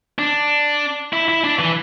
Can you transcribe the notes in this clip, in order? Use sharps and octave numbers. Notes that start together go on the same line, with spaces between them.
D4
E4
E4
D4
E3